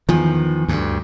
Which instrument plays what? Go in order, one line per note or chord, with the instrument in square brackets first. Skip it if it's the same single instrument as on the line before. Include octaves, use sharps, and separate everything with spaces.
[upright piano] E2 [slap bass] D#3 F3
[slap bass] D2 G2